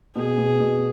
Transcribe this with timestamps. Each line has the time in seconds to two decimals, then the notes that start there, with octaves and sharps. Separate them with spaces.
0.15 B2 G#4
0.38 B2
0.60 B2